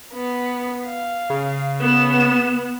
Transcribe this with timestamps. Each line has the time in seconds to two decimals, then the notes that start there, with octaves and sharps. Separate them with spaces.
0.14 B3
0.85 F5
1.30 C#3
1.81 B3 E7